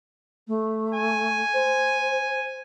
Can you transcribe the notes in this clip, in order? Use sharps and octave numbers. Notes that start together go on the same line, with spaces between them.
A3
G#5
C5